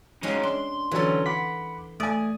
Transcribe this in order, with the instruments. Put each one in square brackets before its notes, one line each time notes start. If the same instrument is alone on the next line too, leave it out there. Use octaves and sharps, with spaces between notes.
[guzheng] G#3 C#4 F#4 [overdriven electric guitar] C4 D#4
[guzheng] D4 [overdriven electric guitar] C6
[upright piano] D3 F#3 C#4 [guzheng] E3 A4
[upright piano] F#5 [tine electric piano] B5 D6 B6
[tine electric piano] A3 [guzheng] D5 [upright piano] G#5 D#6